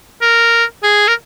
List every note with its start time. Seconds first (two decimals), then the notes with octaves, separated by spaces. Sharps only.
0.22 A#4
0.83 G#4
1.08 A#4